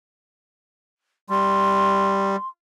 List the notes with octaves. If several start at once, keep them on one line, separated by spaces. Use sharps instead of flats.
G3 C6